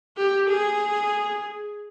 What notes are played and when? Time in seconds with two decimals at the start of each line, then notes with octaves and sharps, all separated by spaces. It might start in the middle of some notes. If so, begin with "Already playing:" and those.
0.17 G4
0.49 G#4